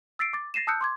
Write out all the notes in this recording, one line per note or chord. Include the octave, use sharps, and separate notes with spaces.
E6 A6 B6 C7 D7
D6 A6
A6 A#6 C7 D#7 E7
A5 D#6 E6 F#6 G6 C#7
C6 D6 G#6